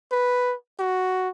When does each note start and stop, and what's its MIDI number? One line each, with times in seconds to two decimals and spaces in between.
0.12 0.55 71
0.79 1.29 66